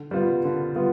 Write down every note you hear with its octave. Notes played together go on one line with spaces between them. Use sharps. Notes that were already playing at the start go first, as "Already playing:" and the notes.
Already playing: D3
G3 B3 F4
D3
G3 B3 F4